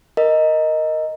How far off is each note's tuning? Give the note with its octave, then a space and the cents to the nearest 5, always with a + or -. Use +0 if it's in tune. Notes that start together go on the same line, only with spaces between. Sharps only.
A#4 +0 D#5 +5